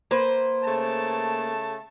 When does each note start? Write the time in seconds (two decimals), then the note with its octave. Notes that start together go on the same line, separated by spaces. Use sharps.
0.11 A#3 B4 C5
0.65 C#3 A3 A5